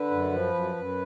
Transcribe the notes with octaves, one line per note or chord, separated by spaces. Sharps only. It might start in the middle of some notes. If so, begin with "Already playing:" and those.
Already playing: D3 B4
F#2
F3
F#2
F#2